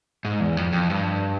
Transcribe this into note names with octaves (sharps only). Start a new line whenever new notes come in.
G#2
E2
F2
F2
G2